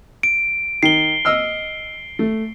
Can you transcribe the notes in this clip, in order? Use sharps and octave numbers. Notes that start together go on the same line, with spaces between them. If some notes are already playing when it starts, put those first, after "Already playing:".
D7
D#3 C7 G7
D#5 E6 F6
A3